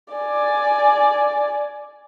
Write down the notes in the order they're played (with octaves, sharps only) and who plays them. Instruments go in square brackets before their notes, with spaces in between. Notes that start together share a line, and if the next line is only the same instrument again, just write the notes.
[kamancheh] D5 G#5